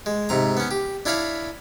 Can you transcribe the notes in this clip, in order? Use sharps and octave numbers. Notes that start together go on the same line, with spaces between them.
G#3
G#2 C3 A#5
B3 C#4
G4
D4 E4 C#5 F5 B5